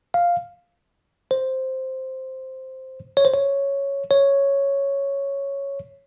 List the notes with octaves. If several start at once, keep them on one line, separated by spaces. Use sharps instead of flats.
F5
C5
C#5
C5
C#5
C#5